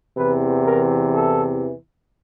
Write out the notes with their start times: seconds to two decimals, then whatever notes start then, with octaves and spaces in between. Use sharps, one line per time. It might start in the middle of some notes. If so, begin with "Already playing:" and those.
0.16 E2 C3 E3 B4
0.66 A#4
1.15 A4